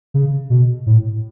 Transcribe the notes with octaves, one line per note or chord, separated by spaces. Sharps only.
C#3
B2
A2